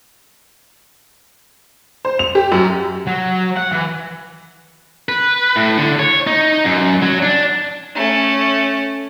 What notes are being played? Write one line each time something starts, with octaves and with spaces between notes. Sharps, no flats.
C5
F7
G4
F#2
F#3
F#5
E3
B4
A2
D3
C#5
D#4
F#2
F#3
D4
A3 C#4